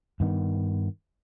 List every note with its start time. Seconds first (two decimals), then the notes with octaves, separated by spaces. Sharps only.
0.20 G2 D#3 B3